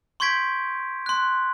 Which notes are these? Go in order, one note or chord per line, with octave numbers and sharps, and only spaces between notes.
C6 C#6 G6 G#6 B6 D7
C6 F#6